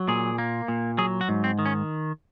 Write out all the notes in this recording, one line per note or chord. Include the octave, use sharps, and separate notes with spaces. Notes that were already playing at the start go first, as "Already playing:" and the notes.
Already playing: F#3
A#2 G#4
A#3
A#2
F#3 G#4
F#4
G#2
C4
D#3
C#4